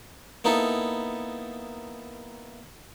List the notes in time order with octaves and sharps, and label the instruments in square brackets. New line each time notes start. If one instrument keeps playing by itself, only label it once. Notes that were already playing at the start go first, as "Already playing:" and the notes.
[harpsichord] A#3 B3 D#4 E4 A4